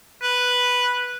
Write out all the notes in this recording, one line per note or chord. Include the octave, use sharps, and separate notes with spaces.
B4